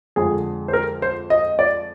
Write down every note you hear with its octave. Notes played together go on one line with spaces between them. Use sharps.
F2 D3 G#3 G#4
C5
A#4
C5
D#5
D5